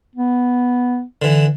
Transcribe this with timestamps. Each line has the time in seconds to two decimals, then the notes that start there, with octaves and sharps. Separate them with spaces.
0.15 B3
1.22 D3 E3